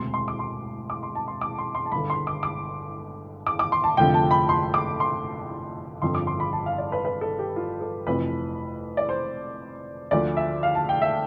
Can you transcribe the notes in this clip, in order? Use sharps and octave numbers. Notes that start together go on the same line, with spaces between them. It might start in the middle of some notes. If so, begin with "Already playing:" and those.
Already playing: E1 D2 C3 C6
C6
D6
C6
D6
C6
A5
C6
D6
C6
C6
A5
G1 G2 D3 B5
C6
D6
D6
D6
D6
C6
A5
F1 F2 D3 F3 G5
A5
B5
C6
D6
C6
G1 F2 D3 F3 C6
D6
C6
B5
A5
F5
D5
B4
B4
A4
G4
F4
A4
F1 F2 C3 E3 B4
D5
C5
D2 D3 F3 D5
E5
F5
A5
G5
E5